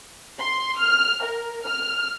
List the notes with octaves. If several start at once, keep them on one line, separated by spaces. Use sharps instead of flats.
C6
F6
A#4
F6